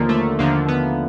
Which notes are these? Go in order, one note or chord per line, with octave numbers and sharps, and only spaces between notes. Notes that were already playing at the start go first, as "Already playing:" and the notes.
Already playing: D#2 D3 F3 A#3
A3
D#2 D3 F3 A#3
B3